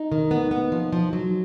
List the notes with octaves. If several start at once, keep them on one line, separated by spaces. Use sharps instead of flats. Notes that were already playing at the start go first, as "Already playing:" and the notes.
Already playing: D#4
D#3
B3
B3
F3
F3
F#3